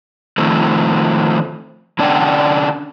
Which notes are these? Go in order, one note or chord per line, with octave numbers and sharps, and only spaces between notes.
D#3 F3 A3 C4
D3 C#4 D4 D5 F#5 G5